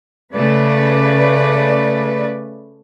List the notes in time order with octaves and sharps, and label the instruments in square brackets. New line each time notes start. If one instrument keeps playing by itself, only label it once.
[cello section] C#3 A3 B4 D5